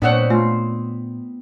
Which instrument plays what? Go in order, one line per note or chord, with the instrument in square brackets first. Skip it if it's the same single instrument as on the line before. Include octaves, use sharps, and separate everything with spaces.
[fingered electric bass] A#2 [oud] B3 C4 C#5 [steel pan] D4 F#5
[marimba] A3 [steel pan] F4